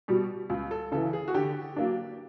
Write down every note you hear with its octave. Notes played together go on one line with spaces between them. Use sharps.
B2 G3
C#2
A4
C#3 E3 A4
G#4
F#4
D3 G4
F#3 A#3 D4